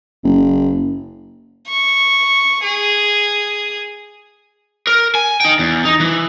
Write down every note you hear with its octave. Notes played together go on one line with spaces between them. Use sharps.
F#1
C#6
G#4
A#4
G#5
D#4 G5
E2
D#4
E3